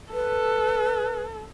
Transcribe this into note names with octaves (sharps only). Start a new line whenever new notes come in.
A4 B4